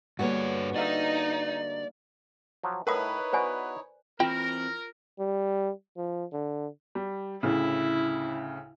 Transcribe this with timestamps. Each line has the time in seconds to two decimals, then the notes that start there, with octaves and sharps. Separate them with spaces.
0.19 G2 D3 G3 A#3 B3 F#4 G#4 C#5
0.76 D#4 D5 E5 F5 E6
2.63 F3 F#3
2.87 A2 D#4 E4 A#4 B4 C#5 F#5 D#6
3.33 B3 F#4 C5 D5 G#5
4.20 E3 C4 F4 A#4 G5
5.19 G3
5.97 F3
6.32 D3
6.95 G3
7.43 D2 A2 C#3 E4